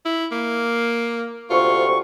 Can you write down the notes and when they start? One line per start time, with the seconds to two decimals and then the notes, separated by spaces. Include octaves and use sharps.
0.06 E4
0.32 A#3
1.50 D2 C3 F4 C#6